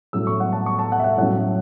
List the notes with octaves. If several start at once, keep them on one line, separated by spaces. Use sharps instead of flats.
A2 F#3 A3 C#4 E4 E6
C#6
F#5
A5
C#6
A5
F#5
E5
F#5
A2 F#3 C#4 F#5